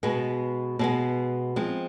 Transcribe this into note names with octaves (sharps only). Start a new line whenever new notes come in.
B2 G#3 B3
B2 G#3 B3
F3 G#3 C4